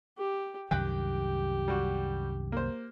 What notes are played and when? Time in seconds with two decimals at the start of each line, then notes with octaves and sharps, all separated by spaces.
0.18 G4
0.71 C2 F#2 D#3 G4 G5 F#6
1.68 G3 F#4
2.52 A#3 C5